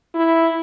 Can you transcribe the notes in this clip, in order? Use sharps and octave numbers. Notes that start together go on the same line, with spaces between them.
E4